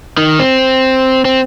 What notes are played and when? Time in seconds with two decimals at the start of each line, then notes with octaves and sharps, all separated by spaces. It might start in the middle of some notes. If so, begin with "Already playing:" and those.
0.17 D#3
0.39 C4
1.25 C4